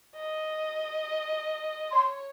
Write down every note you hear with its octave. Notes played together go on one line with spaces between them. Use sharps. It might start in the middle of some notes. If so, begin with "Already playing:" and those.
D#5
C#5 C6